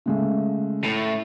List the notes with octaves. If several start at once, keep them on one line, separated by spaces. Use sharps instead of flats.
C#3 G#3 A3
A2